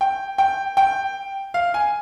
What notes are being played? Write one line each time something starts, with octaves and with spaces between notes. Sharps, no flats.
G5
G5
G5
F5
G#5